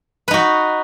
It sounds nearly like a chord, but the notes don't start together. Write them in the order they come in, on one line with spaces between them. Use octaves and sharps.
B4 D#4 F#4